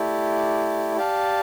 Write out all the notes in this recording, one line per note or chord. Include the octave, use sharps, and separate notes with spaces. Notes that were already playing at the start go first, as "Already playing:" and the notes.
Already playing: A3 E4 G4 D5
G4 D5 F5 A5